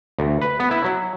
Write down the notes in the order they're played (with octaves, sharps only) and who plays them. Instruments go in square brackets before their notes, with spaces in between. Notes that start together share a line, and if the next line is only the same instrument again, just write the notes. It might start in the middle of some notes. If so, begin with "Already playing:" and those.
[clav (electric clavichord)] D2
B4
B3
E4
F#3